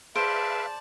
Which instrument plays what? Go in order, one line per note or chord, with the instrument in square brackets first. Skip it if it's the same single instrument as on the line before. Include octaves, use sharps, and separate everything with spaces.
[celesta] G#4 D7 [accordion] B4 E5 F5 [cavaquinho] C5 [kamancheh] D5 A5